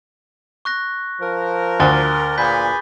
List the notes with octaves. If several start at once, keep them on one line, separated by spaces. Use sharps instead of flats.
C#6 F#6 A#6
F3 A#4
D2 D6 A6 G7
A#2 G#4 B4 G#5 B5 G6 B6